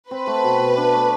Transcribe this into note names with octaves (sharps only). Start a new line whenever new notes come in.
C4 B4
A3
B2
B2
D4
A3